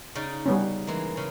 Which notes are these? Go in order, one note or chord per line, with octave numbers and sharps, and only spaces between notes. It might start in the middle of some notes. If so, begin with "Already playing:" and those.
C#3 D#4 D5
G3 B3 C#4
E3 G#3 A#3
C#3